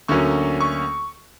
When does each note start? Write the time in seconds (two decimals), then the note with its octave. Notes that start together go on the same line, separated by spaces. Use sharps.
0.08 D2 D3 F#3 A#3 C#4 C#6
0.61 C#6